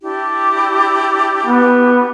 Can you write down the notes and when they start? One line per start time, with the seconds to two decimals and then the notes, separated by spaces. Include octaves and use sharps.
0.01 D4 E4 G4
1.46 B3